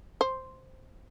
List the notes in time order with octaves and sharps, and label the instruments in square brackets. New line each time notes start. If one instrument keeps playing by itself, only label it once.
[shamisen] C5